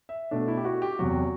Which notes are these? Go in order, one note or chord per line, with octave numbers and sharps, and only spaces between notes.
E5
B2 A3 D4
E4
G4
F#4
G4
E2 C3 F#3 F#4